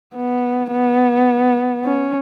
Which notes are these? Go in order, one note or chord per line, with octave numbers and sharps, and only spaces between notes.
B3
B3
C#4